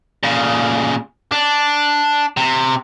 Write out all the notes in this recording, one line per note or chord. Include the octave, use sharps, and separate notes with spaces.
A#2 C#3
D4
C3